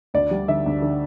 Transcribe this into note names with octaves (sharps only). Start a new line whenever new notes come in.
D2 D5
G3
D3 E5
D2
D3